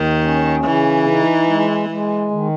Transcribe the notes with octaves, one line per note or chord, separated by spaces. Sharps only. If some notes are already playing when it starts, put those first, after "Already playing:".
Already playing: D#2 D#3
C#4
C#3 E3
D#4
G#3
G#3
D#3